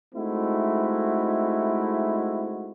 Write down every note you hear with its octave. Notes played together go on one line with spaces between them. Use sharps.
G#3 A3 C4 D#4 E4 F#4